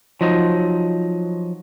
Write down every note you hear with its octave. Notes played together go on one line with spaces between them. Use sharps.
F3 F#3 D#4